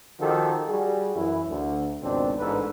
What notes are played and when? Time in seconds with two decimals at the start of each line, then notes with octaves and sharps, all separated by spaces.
0.19 D#3 F3 F#4 G4 A4
0.67 G3 F#4 G#4
1.15 F#2 E3 E4
1.49 D2
2.02 G#1 C#2 B2 C4 D4
2.37 A1 G#2 D4 A4 B4